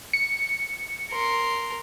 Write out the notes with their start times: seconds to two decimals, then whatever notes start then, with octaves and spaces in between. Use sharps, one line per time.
0.13 C#7
1.11 A#4 C6